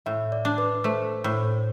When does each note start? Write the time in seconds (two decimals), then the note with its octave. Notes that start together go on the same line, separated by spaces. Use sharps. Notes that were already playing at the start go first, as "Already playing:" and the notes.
0.06 A2 E5
0.32 D5
0.45 D4
0.58 B4
0.84 A3 C5
1.24 A2